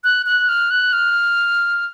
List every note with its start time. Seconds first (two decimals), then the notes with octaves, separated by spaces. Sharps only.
0.04 F#6
0.26 F#6
0.49 F6
0.70 F#6
0.93 F6